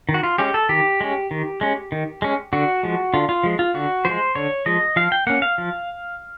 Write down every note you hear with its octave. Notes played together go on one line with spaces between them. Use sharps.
D#3
F#4
F4
G#3 C#4 G4
A4
D#3 G4
G#3 C#4
D#3
G#3 C#4
D#3
G#3 C#4
D3 F#4
F3 G#3
D3 F4
F4
F3 G#3
F4
D3 F#4
F3 G#3 C5
D3 C#5
F3 G#3 D#5
F3 F5
G5
A#3 C#4 F#5
F5
F3